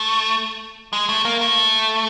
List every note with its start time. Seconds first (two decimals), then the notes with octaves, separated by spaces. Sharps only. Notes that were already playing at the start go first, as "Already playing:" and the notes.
Already playing: A3
0.93 G#3
1.09 A3
1.25 A#3
1.41 A3